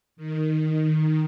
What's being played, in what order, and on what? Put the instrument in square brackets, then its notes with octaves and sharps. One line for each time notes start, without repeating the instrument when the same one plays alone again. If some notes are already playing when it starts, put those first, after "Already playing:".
[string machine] D#3